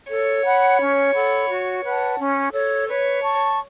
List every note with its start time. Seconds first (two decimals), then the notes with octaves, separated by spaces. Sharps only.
0.10 A4 C#5
0.45 F#5 B5
0.80 C#4
1.14 A4 F#5 B5
1.50 F#4
1.84 B4 F#5 A5
2.19 C#4
2.53 A4 C#5
2.88 B4 C#5
3.23 A5 C#6